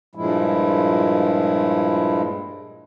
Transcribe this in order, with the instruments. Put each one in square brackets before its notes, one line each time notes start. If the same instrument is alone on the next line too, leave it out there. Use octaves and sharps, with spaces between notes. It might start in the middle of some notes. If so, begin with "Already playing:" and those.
[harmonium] G2 A#2 F3 G#3 E4